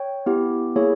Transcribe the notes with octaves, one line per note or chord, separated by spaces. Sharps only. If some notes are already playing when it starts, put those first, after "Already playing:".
Already playing: C#5 G5
B3 E4 G4
A#3 E4 G#4 C#5